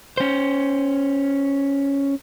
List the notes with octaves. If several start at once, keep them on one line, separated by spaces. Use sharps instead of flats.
C#4 C5